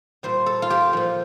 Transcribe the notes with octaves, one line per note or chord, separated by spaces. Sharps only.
A#2 G3 C5
A4
F4
G4
A#2 F3